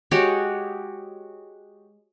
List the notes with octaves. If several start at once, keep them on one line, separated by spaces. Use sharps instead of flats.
G#3 F#4 G4 C#5